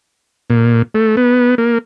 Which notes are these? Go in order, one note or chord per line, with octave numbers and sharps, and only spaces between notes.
A#2
A3
B3
A#3